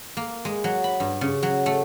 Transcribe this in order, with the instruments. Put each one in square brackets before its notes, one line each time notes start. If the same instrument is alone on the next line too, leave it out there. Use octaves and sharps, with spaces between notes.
[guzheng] A#3
G#3
F#3
B5
G2
C#3
F#3
A3